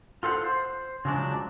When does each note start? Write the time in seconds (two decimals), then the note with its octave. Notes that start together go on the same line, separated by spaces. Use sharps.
0.23 F4 A4 C5 F5 F#5
0.44 C5
1.05 C#3 F3 F#3 G#3 D4